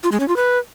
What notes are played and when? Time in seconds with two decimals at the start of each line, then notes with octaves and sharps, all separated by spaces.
0.03 F4
0.12 G#3
0.20 C#4
0.28 F4
0.36 B4